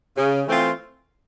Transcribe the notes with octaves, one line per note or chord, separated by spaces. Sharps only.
C#3
E3 A3 C4 F4